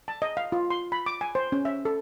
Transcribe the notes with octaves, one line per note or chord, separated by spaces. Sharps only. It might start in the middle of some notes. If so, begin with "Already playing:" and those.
A5
D#5
F5
F4
C6
B5
D6
G#5
C5
C#4
E5
A4